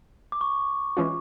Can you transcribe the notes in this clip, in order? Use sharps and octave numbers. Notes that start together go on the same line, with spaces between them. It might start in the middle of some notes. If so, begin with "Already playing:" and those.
D6
C#6
E3 G#3 C#4 F4